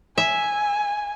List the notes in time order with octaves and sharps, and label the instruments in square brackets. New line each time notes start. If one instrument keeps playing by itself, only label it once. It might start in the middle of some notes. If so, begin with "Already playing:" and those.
[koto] E5 [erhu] G#5